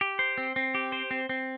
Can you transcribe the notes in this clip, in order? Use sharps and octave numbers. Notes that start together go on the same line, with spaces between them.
G4
C5
C4
C4
G4
C5
C4
C4